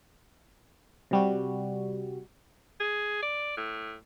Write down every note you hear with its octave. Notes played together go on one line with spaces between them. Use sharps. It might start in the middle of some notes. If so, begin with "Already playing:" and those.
C3 G3 F#4
G#4
D5
A2